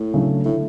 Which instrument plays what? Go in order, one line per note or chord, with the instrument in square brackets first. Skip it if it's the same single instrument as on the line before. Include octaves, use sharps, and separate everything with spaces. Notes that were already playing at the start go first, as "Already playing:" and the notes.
Already playing: [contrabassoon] A2
[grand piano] C#3 F#3 A3 D4
[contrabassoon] A2 [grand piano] D3 A3 E4